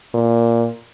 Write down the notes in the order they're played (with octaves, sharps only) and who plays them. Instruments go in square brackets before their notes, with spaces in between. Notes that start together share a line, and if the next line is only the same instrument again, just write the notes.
[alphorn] A#2